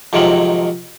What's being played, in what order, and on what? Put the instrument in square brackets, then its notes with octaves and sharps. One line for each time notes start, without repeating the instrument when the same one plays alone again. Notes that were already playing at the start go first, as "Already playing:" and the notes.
[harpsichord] F2 G#2 C3 D#3 F#3